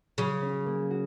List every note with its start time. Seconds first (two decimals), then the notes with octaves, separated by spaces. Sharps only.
0.18 C#3 F#3
0.42 C#4
0.66 A#3
0.91 F#4